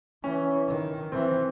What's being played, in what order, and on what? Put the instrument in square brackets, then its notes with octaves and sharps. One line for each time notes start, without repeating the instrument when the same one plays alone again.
[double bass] E3 [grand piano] C#4
[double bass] D#3
[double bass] E3 [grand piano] C4